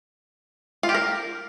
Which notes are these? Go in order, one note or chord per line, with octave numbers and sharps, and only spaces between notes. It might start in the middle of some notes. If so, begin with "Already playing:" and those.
F4
G4
A#4